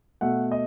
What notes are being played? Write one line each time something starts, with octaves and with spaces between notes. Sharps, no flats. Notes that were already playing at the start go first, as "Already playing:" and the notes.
B2 A3 F#5
D#5